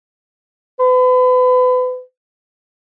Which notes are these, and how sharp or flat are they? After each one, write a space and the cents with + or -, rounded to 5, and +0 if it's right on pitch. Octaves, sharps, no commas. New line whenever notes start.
B4 +35